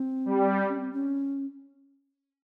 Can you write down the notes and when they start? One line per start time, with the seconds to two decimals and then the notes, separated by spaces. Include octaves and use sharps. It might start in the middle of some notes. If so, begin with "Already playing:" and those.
Already playing: C4
0.26 G3
0.68 C#4
0.80 C4
0.93 C#4